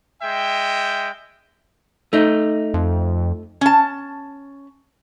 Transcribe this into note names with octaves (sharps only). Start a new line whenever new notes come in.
G#3 E5 G5
A3 D#4
F2
C#4 A5